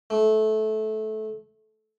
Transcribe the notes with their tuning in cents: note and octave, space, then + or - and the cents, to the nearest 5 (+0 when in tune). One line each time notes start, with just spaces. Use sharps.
A3 -20